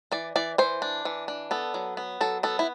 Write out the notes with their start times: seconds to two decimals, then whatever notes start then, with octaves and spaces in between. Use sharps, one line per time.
0.12 E3 D5
0.36 E3 D5
0.58 E3 C5
0.82 D4
1.05 E3
1.28 D4
1.51 B3 A4
1.74 F#3
1.97 B3
2.21 F#3 A4
2.43 B3 A4
2.59 E4